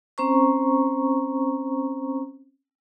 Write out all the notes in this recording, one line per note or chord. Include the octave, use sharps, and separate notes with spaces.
C4 C#4 C5 A#5 C#6